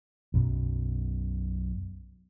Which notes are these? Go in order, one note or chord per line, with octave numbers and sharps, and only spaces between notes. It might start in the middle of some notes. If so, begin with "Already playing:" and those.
B1 F#2 B2